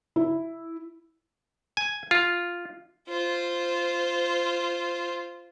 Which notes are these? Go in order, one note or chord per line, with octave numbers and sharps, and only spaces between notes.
E4
G#5
F4
F4 C5